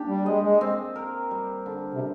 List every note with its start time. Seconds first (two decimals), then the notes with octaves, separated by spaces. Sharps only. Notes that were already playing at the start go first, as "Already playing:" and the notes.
Already playing: A#3 D4 G4
0.08 G3
0.26 G#3 D#5
0.43 G#3
0.61 C4
0.96 A#4
1.31 G3
1.66 D3
1.93 C3